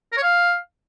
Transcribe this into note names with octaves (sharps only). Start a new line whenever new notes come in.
A#4
C#5
F5